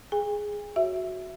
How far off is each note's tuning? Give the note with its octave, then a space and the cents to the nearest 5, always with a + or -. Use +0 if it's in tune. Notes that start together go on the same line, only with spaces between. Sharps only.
G#4 +0 G#5 -45
F#4 +0 C#5 +0 E5 +0